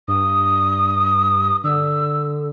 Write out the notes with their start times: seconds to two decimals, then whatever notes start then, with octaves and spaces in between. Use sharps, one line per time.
0.08 G2 D#6
1.64 D3 E6